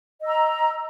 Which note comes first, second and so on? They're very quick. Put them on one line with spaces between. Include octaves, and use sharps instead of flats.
D#5 E6 A#5